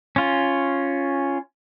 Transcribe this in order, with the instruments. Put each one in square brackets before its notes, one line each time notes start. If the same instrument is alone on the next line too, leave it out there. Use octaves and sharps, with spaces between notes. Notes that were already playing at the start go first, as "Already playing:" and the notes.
[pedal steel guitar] C#4 F4